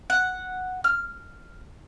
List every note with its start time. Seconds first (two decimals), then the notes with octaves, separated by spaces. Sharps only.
0.10 F#5
0.84 F6